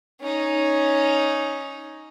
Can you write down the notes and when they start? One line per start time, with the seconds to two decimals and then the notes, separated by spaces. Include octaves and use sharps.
0.20 C#4 D#4